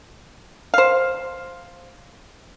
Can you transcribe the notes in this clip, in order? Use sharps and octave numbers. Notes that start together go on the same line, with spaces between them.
C5 F5